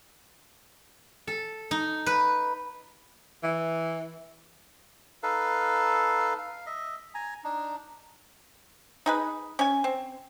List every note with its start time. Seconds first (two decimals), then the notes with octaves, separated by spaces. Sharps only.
1.27 A4
1.71 D#4
2.06 B4
3.43 E3
5.23 D#4 A4 B4 F5
6.39 F5
6.66 D#5 E5
7.14 G#5 A#5
7.44 D4 D#4
9.06 D#4 G#4 B4
9.59 C#4 G#5
9.84 C4